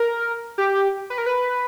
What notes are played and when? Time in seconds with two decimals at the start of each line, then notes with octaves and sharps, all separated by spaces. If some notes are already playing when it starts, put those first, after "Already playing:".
Already playing: A#4
0.58 G4
1.10 B4
1.18 A#4
1.26 B4